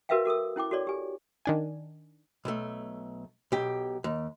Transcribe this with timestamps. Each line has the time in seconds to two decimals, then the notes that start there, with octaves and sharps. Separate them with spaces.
0.09 F#4 A#4 B4 E5 F5 G5
0.25 F#4 A4 A#4 D#6
0.56 C#4 E4 G5 D6
0.71 F#4 A4 C#5 D5
0.87 G4 G#5
1.46 D#3 D4 G#5
2.45 B1 A3
3.52 B1 G4
4.04 D#2